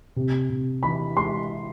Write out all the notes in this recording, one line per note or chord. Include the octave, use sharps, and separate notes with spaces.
C3
C3
E3 B5
G#3 C6